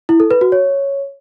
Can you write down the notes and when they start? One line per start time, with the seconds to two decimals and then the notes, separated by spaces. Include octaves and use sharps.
0.09 E4
0.20 A4
0.31 B4
0.41 F#4
0.52 C#5